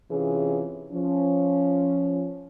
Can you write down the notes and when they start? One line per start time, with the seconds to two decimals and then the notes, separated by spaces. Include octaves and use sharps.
0.10 C3 E3 C#4 F4 G#4
0.92 F3 C#4